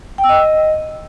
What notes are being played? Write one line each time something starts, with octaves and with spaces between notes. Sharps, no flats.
G5
E6
D#5